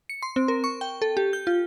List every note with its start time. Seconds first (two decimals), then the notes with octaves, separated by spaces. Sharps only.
0.09 C#7
0.23 C6
0.36 C4
0.48 A#4
0.64 C#6
0.81 G5
1.02 A4
1.17 G4
1.33 G6
1.47 F4